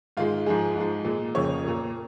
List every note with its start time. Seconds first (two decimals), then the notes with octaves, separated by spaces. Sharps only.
0.17 G#2 D#3 G#3 F4
0.46 G#2 F3 G#3 G#4
0.76 G#2 F3 G#3
1.05 A#2 G#3
1.35 F2 C#3 F3 A#3 C#5
1.64 A#2 A#3